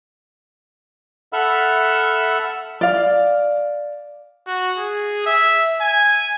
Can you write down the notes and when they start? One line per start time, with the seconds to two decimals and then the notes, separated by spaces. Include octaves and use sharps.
1.33 A4 E5 F#5 B5 E6 F6
2.81 D5 F5
4.47 F#4
4.78 G#4
5.26 E5
5.82 G#5